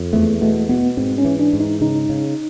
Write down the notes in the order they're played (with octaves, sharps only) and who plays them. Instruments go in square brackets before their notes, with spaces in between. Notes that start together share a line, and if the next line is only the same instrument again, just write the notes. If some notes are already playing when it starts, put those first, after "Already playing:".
Already playing: [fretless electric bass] F2
[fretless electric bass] E2 [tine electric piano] A3
[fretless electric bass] B2 [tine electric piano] A3
[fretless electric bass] B2 [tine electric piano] B3
[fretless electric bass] G#2 [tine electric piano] C4
[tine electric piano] C#4
[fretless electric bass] E3
[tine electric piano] D4
[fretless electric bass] G#2
[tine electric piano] D#4
[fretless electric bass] C#3 [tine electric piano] D#4
[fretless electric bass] C#3